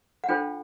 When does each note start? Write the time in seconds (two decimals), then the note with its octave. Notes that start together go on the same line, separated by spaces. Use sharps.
0.24 F#5
0.29 D4 F4 A4 C5 G5